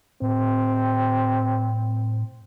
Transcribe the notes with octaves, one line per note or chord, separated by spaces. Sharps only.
A2 C4